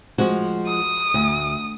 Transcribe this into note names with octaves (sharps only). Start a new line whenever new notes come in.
F3 G#3 F#4
D#6
D2